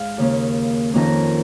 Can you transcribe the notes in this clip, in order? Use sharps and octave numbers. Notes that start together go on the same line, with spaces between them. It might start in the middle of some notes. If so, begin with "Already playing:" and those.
Already playing: G#2 F5 G#5
D#2 C#3 A#3 C#4
F2 D#3 A#3 C#4 A#5